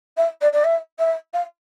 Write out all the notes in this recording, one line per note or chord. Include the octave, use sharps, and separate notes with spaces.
E5
D5
D5
E5
E5
F5